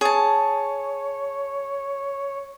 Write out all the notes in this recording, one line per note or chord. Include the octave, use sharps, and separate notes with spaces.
G#4 C#5 A5